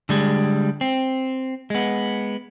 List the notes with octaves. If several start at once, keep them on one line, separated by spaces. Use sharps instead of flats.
D3 G3 G#3
C4
G#3 B3